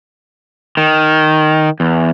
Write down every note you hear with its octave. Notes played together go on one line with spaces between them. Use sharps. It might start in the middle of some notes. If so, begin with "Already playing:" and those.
D#3
E2